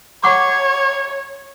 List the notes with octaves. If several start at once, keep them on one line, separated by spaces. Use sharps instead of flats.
C#5 F#5 C#6 D6